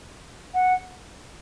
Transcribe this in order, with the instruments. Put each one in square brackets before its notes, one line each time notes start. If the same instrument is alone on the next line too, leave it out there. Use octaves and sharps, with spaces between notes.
[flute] F#5